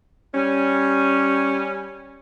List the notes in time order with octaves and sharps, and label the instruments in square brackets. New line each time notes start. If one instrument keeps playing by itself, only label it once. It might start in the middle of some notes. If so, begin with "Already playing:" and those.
[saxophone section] G3 C#4